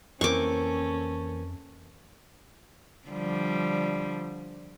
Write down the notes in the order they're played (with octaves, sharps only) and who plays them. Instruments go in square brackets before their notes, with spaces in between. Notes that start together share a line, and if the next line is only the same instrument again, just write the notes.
[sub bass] F2 [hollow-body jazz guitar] E3 A#3 C4 [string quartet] C#4 A4 [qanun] C#6 D6
[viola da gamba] D3 F3 G3